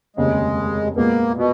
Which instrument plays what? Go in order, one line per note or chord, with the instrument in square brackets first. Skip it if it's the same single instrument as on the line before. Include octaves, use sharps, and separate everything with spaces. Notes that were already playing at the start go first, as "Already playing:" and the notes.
[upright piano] F1 D#2 C#3 [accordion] G#3
[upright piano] A#2 G#3 B3 [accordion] A#3
[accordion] B2